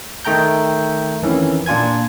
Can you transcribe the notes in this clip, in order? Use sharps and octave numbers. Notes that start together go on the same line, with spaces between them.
D#3 A3 G5 A#5 G6
F2 D#3 E3 C#4
A#2 D4 F4 G#5 G#6